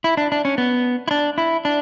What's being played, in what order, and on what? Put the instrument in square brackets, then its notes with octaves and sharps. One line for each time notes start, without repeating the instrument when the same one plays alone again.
[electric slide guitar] E4
D4
D4
C#4
B3
E4
D4
E4
D4